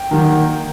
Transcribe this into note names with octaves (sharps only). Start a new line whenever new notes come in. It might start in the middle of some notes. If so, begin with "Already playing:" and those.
Already playing: G5
D#3 F#3 A#3